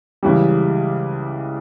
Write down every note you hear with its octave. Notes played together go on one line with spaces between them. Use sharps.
C#2 C#3 E3 G3